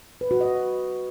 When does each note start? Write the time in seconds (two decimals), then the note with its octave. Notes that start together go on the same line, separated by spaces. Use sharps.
0.21 B4
0.31 F#4
0.41 D#5